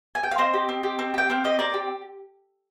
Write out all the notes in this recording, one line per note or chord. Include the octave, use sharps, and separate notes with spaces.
G#5
G5
F5
C4 C5 D#5
G4
C4
G4
C4
G4 G5
C4 F5
G4 D#5
C4 A#4 D5
G4